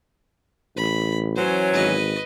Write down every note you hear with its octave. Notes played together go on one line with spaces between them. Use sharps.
A1 B5
E3 F#3 C#4 C5
G#1 B4 D#5